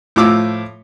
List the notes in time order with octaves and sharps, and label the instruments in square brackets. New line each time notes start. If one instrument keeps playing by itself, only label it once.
[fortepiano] A2 F3 D6 E6